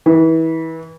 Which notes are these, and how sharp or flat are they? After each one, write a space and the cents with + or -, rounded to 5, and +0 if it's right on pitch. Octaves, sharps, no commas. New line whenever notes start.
E3 -30